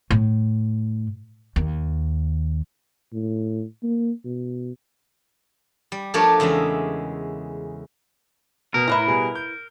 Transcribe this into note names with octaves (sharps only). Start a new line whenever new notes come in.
A2
D#2
A2
A#3
B2
G3
F3 A3 D4 G4 A#4 C#5
E2 C#3 G#3 E5
B2 A#4
A2 E4 B4 A#5
B2 G3 G#4
G6